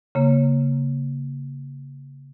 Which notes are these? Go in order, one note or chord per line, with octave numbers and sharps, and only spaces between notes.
C#3 A#3